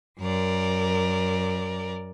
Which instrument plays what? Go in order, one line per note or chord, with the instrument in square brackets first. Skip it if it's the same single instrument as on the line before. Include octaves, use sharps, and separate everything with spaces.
[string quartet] F#2 A#4 D5